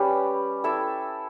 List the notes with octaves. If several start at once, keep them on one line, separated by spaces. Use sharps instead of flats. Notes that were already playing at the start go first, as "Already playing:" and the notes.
Already playing: G3 C#4 G4 B4
E4 A4 E5